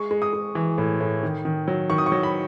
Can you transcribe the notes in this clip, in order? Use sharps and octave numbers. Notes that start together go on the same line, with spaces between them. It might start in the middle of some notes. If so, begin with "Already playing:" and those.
Already playing: G#3 C#6
G#3
D#6
G#3
E3
A2
A2
D#3
D#3
F#3
D#3 C#6
D#6
C#6
F#3
B5